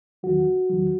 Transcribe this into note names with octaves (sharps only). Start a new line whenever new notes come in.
E2 D#3 F#3 F#4
E2 D#3 F#3